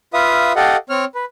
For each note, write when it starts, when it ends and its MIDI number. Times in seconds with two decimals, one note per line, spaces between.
0.14 0.52 65
0.14 0.52 71
0.14 0.52 76
0.14 0.52 77
0.14 0.52 87
0.56 0.77 67
0.56 0.77 69
0.56 0.77 75
0.56 0.77 77
0.56 0.77 78
0.90 1.05 60
0.90 1.05 73
0.90 1.05 89
1.15 1.25 71